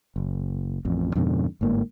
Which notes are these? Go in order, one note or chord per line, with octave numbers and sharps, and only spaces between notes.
F#1
A1 F2
F2 G#2 B2 D3
G1 G#2 A#3